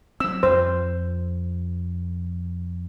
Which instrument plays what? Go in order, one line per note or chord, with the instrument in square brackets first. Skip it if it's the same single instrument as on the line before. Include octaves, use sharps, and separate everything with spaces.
[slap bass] F#3 C4 [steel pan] E6
[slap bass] F2 [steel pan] C5